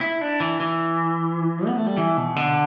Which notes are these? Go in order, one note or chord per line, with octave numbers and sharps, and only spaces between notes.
E4
D4
E3
E3
B3
A3
G3
E3
B2
D3